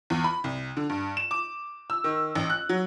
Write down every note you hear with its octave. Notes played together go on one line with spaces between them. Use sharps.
E2
B5
C2
D3
G2
E7
D6
E6
D#3
A1
F#6
F#3